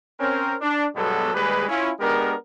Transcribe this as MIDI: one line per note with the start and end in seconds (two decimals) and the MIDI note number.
0.20 0.55 60
0.20 0.55 61
0.20 0.55 70
0.62 0.86 62
0.95 1.31 43
0.95 1.31 47
0.95 1.31 54
0.95 1.31 56
0.95 1.31 59
0.95 1.31 69
1.34 1.67 39
1.34 1.67 55
1.34 1.67 56
1.34 1.67 68
1.34 1.67 71
1.68 1.91 61
1.68 1.91 64
1.68 1.91 65
2.00 2.34 56
2.00 2.34 59
2.00 2.34 62
2.00 2.34 67
2.00 2.34 70